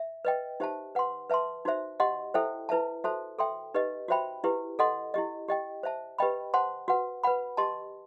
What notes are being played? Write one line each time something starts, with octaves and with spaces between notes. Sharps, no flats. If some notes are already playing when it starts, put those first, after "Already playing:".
Already playing: E5
B4 D#5 G5
D#4 G4 C5 E5 A5
B4 F#5 C6
B4 E5 A5 C6
D#4 F#4 C5 E5
G4 D#5 F#5 C6
E4 A4 C5 E5 G5
E4 B4 E5 A5
F#4 A4 C5 E5 A5
A4 E5 G5 C6
D#4 G4 B4 D#5
F#4 C5 E5 G5 B5
E4 G4 B4
A4 D#5 F#5 C6
E4 G4 D#5
G4 D#5 G5
C5 E5 A5
G4 B4 D#5 G5 B5
C5 F#5 A5 C6
F#4 B4 F#5
B4 F#5 B5
G4 D#5 A5 C6